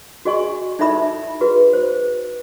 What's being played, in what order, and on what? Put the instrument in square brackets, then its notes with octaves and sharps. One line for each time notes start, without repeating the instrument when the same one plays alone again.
[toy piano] F#4 G#4 D#5 G#5 C#6
D#4 E4 A4 E5 B5 D#6
F#4 G#4 B4
C5